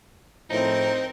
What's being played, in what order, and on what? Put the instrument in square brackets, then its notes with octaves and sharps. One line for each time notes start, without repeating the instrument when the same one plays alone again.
[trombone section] A2 F3 [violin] C4 A#4 [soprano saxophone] D#4 [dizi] C5